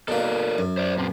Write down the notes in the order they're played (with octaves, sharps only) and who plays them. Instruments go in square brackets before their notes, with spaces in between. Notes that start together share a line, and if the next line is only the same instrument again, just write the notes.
[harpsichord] B2 A#3 [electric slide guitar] A4 A#4 D5
[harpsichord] F#2
[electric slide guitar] C5 D5
A#2 C4